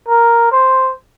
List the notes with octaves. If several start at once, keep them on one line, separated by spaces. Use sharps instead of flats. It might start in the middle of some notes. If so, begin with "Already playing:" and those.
A#4
C5